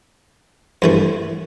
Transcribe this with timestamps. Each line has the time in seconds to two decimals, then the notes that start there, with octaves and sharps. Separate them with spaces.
0.82 G2 E3 A3